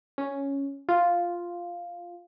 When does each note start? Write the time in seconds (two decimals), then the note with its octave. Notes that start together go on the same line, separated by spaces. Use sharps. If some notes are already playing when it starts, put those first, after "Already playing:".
0.18 C#4
0.89 F4